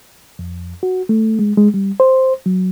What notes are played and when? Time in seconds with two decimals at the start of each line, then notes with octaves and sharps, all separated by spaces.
0.39 F2
0.83 F#4
1.09 A3
1.39 G#3
1.57 G#3
1.74 G3
2.00 C5
2.46 F#3